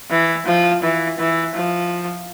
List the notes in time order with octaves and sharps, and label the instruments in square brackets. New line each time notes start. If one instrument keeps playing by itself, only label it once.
[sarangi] E3
F3
E3
E3
F3